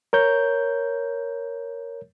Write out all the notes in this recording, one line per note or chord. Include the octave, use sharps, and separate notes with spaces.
A#4 C#5 G6